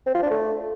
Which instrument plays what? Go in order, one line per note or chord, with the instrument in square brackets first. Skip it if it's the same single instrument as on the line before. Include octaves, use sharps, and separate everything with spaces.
[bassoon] C4
F4
D4
A3